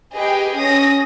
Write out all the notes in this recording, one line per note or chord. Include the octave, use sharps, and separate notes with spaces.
G4 G#4 B4 D#5 G5
C#4 C#5 D#6 A#6